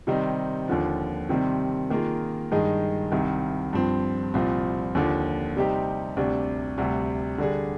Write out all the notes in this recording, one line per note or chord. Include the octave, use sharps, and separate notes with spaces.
C3 D#3 G3 C4 D#4
D#2 D3 F3
C3 D#3 G3 C4
D#3 A#3 F4 G#4
G2 D#3 G#3 D#4 G#4
C2 C3 D#3
G2 F3 C4
C2 A#2 F3 C4
D#2 D3 F3
C3 G3 C4 D#4 G4
D2 C3 G3 D4
D2 C3 G3
D3 G3 D4 G#4